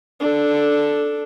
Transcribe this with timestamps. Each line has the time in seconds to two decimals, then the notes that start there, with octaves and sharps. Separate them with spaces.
0.20 D4 A4